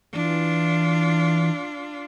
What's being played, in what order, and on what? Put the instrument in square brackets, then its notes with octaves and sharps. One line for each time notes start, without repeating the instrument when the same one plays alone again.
[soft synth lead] E3 [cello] D4 F4